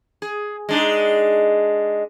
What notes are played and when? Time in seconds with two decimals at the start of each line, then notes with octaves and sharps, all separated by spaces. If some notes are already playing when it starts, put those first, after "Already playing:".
0.22 G#4
0.69 G#3 D4 D#4